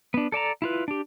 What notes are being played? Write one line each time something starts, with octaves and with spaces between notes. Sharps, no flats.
B3 D4
A4 D5 A5 A#5
E4 F4 B4
D4 G4